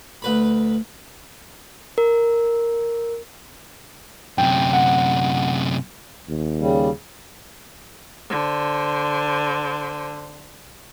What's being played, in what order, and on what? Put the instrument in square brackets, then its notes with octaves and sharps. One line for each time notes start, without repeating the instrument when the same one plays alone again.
[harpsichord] D2 B4 B5
[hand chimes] A#4
[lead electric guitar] F#2 C3 [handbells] G5
[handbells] F#5
[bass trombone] D#2
[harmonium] C#3 G3
[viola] D3 C5